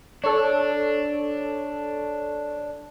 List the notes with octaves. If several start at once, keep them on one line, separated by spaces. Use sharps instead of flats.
D4 A4 C#5